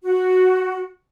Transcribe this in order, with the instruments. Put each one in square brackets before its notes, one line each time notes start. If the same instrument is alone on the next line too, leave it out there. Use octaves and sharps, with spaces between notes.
[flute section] F#4